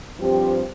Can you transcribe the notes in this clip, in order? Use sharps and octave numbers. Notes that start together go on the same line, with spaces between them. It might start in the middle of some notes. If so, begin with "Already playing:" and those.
G2 F3 C4 G4